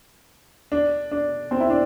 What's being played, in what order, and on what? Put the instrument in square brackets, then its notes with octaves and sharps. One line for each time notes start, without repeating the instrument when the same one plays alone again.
[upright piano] D4
D4
C4
E4
D4